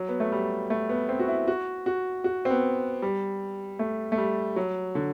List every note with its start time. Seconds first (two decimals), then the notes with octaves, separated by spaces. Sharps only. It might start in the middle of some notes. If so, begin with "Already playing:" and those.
Already playing: F#3
0.09 B3
0.20 A3
0.32 G3
0.70 A3
0.89 B3
1.09 C4
1.20 F#4
1.28 E4
1.48 F#4
1.86 F#4
2.24 F#4
2.45 C4
2.50 B3
3.02 G3
3.79 A3
4.12 A3
4.18 G3
4.56 F#3
4.95 D3